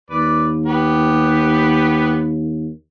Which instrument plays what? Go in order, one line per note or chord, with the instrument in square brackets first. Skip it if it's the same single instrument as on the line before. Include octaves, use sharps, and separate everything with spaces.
[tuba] D#2 [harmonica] B4 D5
[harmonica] B3 G4 B4